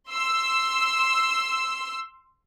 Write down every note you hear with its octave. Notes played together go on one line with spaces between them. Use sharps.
C6 E6